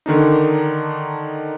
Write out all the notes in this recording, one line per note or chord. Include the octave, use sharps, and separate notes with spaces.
D3 D#3 D4 D#4